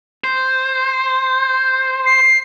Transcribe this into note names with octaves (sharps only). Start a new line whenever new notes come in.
C5
C7